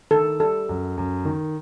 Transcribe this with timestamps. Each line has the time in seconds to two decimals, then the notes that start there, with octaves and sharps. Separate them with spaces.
0.11 D#3 A4
0.40 G3 A4
0.69 F#2
0.97 F#2
1.25 D#3